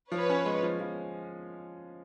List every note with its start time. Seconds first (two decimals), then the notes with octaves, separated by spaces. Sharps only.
0.12 F3 B4 C#5
0.30 C#4
0.45 G#3
0.63 F3
0.80 F3